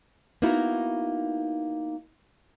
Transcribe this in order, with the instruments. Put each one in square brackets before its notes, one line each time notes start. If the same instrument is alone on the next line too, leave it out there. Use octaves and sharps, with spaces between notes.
[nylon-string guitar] A#3 B3 D#4 E4 F#4